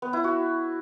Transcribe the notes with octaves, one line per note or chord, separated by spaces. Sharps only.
B3
E4
F#4